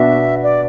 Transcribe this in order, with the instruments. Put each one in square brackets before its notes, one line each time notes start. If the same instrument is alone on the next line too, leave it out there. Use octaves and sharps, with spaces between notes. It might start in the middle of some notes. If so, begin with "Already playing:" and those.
Already playing: [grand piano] B2 B3 D4 F#4 [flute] E5
[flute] D5